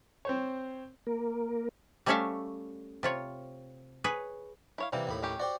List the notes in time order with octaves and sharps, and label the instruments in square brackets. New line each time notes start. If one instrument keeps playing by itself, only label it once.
[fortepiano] C4 C5 C#5
[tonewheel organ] A#3 A#4
[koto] G3 A3 C#4 C#5 E5 F5
C3 F4 C#5
G#4 B4 C#5
[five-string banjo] E4 C#5 F5
[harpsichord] C3 E3 [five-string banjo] G3 A#3 C4
[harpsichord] D#2 A2 B5
[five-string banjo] D#3 C#4 G4
[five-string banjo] F#4 [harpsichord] G4 C5 D5